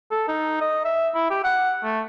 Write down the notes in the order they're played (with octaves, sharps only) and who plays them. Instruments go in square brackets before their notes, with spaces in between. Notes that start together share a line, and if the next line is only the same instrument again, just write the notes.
[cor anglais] A4
D#4
D#5
E5
E4
G4
F#5
A3